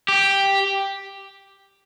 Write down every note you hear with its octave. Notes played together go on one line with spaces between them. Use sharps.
G4